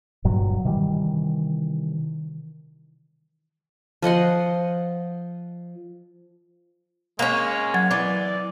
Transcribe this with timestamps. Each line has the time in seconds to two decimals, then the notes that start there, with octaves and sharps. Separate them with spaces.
0.24 G1 G2 A#2 F#3
0.64 C3 D#3 E3 G3
4.02 F3 D#5 F#5 C6
7.19 G#3 A#3 C#4
7.74 F#3 G#6
7.91 E3 D5